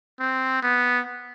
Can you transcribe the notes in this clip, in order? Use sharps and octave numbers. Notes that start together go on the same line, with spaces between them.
C4
B3